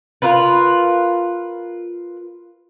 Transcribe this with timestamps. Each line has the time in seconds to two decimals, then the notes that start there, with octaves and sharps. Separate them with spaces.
0.22 F4 A#4 B4